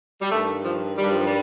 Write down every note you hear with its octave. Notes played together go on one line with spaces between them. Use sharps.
G3
G2 D#3 A3
F3
G2 D#3 G3
F3
G3